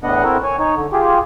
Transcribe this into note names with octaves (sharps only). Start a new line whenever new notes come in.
E2 A2 B3 D4 D#5 F#5
C4 E4 F#4 A4 A#4
C#5 G#5
D#4 C#5
D3
F4 G4 G#4